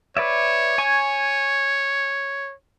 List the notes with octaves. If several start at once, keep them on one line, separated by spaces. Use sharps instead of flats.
B4 C#5 D5 E5
G#5 C#6